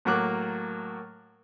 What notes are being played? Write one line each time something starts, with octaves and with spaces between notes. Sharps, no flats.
A2 F#3 A#3 D6 F#6